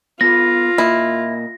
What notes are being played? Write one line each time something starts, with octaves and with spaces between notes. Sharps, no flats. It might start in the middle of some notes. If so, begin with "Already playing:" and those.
B3 F4 A4 B4 A#6
A#2 A#3 E4 D#5